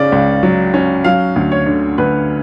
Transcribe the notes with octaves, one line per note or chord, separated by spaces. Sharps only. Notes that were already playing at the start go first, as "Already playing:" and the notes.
Already playing: C#3 C#4 D5
C#2
F#3
C#4
F#3 F5
D2
C#5
D3
D2 B4